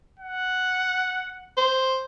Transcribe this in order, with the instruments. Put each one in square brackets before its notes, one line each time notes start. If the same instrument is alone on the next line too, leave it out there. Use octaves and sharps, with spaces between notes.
[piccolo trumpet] F#5
[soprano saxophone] C5